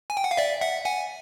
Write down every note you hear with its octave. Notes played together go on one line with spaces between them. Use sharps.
G#5
G5
F#5
F5
D5 E5
E5 F#5
F#5 G#5